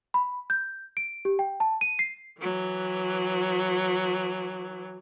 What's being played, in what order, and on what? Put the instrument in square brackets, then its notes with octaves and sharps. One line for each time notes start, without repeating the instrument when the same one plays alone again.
[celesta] B5
G6
D7
G4
G5
A5
D#7
C7
[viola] E3 F#3